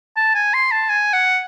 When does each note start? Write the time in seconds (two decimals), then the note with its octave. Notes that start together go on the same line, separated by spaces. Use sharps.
0.17 A5
0.35 G#5
0.54 C6
0.71 A5
0.89 G#5
1.13 F#5